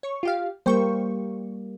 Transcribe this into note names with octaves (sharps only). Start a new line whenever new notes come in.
C#5 C#6
F4 G4 F5
G3 A#3 C5 G5 C#6